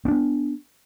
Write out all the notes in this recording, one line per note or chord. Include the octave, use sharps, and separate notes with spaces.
B3 C4 D4